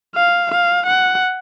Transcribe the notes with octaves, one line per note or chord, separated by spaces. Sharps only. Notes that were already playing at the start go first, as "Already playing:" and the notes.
F5
F5
F#5